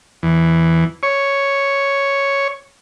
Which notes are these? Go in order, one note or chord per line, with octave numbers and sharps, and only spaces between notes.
E2
C#5